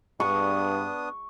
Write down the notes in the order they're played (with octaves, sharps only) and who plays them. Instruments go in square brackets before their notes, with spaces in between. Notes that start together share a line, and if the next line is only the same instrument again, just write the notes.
[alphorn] G2 [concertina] B3 D4 D#6 [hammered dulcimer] C#6